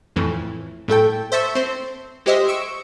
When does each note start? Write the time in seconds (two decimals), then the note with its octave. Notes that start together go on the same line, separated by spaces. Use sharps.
0.16 F2 A2 E3
0.88 A2 A3 A4 G5
1.32 C5 E5 A5 C#6 E6
1.55 C4 C5
2.26 G#3 G4 C5 D#5 E5
2.48 C#6 E6 D7